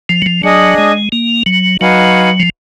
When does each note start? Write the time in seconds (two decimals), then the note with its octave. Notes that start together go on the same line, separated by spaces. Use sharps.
0.09 F3
0.22 F#3
0.26 F3
0.43 F#3 D4 G#4 D#5
0.78 G#3
1.12 A#3
1.46 F#3
1.81 F#3 D#4 F#4 B4 F5 G#5
2.40 F3